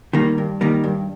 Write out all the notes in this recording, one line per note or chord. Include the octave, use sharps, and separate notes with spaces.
D#3 G3 A#3
G2
D#3 G3 A#3
G2